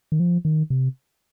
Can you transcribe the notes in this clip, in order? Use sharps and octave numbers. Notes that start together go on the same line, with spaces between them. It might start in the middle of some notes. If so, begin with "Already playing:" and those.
D#3
F3
D#3
C3